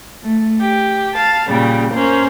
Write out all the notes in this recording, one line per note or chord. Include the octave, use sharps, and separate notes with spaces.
A3
G4
F5 A5
A#2 C#3 G3
A#3 C#4 C5